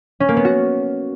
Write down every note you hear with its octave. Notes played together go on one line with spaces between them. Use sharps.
C#4
A#3
B3
F#4